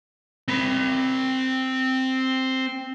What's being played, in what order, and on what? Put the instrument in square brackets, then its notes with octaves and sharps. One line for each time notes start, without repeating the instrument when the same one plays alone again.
[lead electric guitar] C4 B5